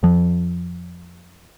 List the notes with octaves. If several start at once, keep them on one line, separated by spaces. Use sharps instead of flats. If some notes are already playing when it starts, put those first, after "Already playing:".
F2 F3